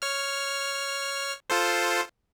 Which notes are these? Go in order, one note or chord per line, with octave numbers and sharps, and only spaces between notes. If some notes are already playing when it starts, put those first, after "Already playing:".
C#5 F6
F4 A4 C5